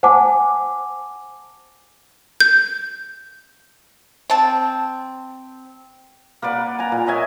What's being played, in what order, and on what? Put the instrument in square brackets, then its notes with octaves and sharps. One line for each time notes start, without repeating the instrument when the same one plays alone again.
[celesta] C5 F#5 G#5 A5 D6
[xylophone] G6
[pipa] C4 A5
[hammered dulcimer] A#3 B4 D5 F#5
G#5 A#5
A#2
C#5 D#5 E5 G#5